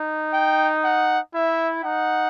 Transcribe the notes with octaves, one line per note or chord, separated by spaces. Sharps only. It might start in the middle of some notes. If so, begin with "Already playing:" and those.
Already playing: D#4
G5
F#5
E4 E5
D#4 F#5